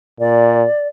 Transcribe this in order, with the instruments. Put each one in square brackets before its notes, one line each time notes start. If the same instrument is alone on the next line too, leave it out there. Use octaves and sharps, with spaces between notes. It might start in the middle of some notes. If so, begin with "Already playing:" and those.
[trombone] A#2 [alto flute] D5